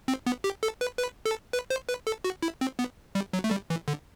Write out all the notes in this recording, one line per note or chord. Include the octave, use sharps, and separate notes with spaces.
C4
B3
G4
A4
B4
B4
A4
B4
C5
B4
A4
F#4
E4
C4
B3
G3
F#3
A3
G3
E3
D3